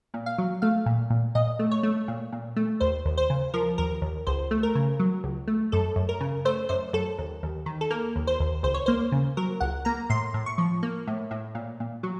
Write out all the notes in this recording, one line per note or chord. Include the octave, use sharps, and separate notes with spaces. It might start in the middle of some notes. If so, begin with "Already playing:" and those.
A#2
F5
F#3
A3 F5
A#2
A#2
A#2 D#5
A3
C#5
A3
A#2
A#2
A3
D#2 C5
D#2
C5
C#3
F3 A#4
D#2 A#4
D#2
C#2 C5
A3
A#4
C#3
F#3
C#2
A3
F#2 A4
F#2
A#4
C#3
A3 C5
F#2 C5
F#2 A4
D#2
D#2
D#3
A4
A#3 A#4
D#2
C5
D#2
C#2 C5
C#5
A#3 C5
C#3
F#3 A#4
C#2 F#5
A#3 A#5
A2 C6
A2
C#6
F3
A#3
A2
A2
A#2
A#2
F#3